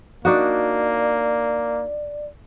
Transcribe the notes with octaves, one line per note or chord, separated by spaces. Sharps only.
A#3 D4 D#4 F#4 D5